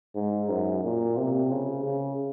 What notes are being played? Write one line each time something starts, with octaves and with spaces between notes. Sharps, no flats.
G#2
F#2
A#2
C3
C#3
C#3